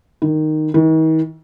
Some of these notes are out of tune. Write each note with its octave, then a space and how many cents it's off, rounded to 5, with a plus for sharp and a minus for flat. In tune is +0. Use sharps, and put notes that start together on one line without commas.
D#3 -5
D#3 +45